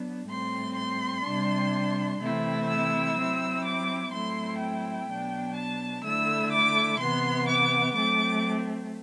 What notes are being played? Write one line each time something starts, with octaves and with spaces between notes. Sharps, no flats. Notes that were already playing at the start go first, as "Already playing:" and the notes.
Already playing: F#3 B3 D4
A2 G3 C4 C6
C6
C3 G3 D4
C3 E3 A3 C4 E4
E6
F#3 C4 E4
D6
A2 F#3 A3 C4 E4 C6
G5
B2 F#3 B3 D4
A5
D3 A3 E4 E6
D6
C3 E3 B3 C6
D6
F#3 A3 C4 D6